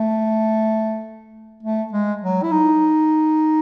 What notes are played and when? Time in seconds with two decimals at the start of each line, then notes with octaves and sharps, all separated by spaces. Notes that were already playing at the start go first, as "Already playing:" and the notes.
Already playing: A3
1.63 A3
1.92 G#3
2.22 F#3
2.43 E4
2.51 D#4